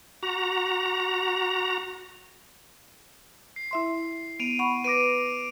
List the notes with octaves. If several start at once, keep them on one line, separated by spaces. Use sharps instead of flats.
F#4 A#5
C7
E4 E5 C6
B3 D7 D#7 F7
F#5 B5 C#6
B4 D6 A#6 D7 D#7